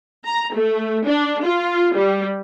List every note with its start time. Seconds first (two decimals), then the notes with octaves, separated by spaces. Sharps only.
0.25 A#5
0.56 A3
1.07 D4
1.44 F4
1.95 G3